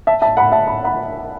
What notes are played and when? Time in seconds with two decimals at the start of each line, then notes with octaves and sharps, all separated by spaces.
0.07 E5 A5
0.22 E5 A5
0.37 F#5 B5
0.52 E5 A5
0.67 B5
0.84 F#5 B5